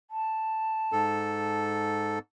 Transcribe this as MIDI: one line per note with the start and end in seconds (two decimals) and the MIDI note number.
0.11 1.70 81
0.92 2.19 44
0.92 2.19 69